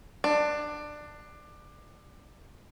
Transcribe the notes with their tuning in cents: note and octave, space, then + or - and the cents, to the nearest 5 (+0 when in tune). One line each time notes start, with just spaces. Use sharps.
D4 +20